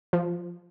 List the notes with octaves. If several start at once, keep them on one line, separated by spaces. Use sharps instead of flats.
F3